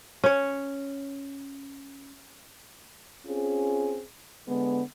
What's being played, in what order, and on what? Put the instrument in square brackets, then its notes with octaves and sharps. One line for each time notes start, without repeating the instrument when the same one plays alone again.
[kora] C#4 C#5
[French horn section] C4 C#4 F4 G#4
D3 G#3 B3